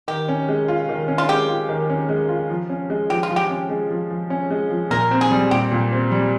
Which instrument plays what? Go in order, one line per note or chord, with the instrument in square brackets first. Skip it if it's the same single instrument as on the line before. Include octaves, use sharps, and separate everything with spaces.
[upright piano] D#3 [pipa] G4
[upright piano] C#4
G#3
F4
D#3
C#4
[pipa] F4
[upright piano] G#3 [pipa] G4
[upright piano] F4
D#3
C#4
G#3
F4
F3
C#4
G#3
[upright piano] F3 [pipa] G4
[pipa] F4
[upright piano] F3
[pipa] G4
[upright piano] C#4
G#3
F3
F3
C#4
G#3
F3
[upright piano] A#2 [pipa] A#4
[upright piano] C4
[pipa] G#4
[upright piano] G3
[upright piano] A#2 [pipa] G4
[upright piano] A#2
C4
G3